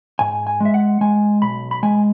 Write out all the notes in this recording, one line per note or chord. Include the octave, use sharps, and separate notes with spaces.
G#2 G#5
G#5
G#3
E5
F#5
G#3 G#5
B1 B5
B5
G#3 G#5